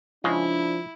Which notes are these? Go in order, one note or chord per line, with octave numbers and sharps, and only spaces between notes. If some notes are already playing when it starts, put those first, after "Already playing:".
C#3 F3 G#3 D4 E4